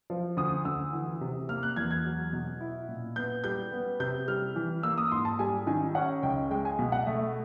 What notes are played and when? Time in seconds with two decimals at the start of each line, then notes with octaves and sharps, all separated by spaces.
0.10 F3
0.37 D2 D#6
0.65 D2 E6
0.93 E3
1.21 C3
1.49 A#3 F6
1.63 F#6
1.76 E2 G#6
1.91 G#6
2.05 F#3
2.33 B2
2.61 E4
2.89 A#2
3.16 B3 G6
3.44 G3 G6
3.72 B3
4.00 C3 G6
4.28 G3 F6
4.56 E3
4.83 A#3 E6
4.98 D#6
5.11 G#2 C6
5.25 A5
5.39 G3 G#5
5.67 D#3 G#5
5.95 C#4 F#5
6.23 C#2 G5
6.51 G#3 G5
6.65 G#5
6.79 B2
6.92 F#5
7.07 A3 E5